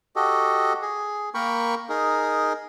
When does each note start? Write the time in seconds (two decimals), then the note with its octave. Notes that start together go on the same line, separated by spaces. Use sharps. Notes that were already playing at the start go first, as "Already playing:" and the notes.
0.16 F#4 G4 A4 D#5
0.82 G#4
1.34 A#3 A#4 G5 B5 C#6
1.89 D#4 G#4 A#4